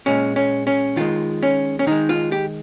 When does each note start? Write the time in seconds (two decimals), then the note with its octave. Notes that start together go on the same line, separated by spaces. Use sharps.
0.06 A#2 G#3 C#4
0.36 C#4
0.67 C#4
0.96 D#3 G#3 F4
1.43 C#4
1.79 C#4
1.87 D#3 G#3 D#4
2.09 F4
2.32 G4